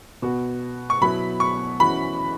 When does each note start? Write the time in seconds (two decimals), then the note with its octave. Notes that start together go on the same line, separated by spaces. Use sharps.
0.22 B2 B3 F#4
0.90 C#6
1.01 B2 F#3 B3 E4 B5
1.40 C#6
1.80 E3 C#4 F#4 B5